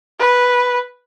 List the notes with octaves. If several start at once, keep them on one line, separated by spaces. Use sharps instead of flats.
B4